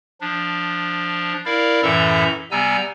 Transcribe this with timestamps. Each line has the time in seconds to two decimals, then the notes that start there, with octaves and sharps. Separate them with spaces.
0.21 F3 D4
1.45 E4 A#4 D5 F5
1.83 F#2 A2 E3 A4 E5 A#5
2.51 C3 G3 B3 G#5 A#5 E6